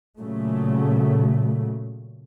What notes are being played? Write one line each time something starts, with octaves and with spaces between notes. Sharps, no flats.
A#2 C#3 F#3 A3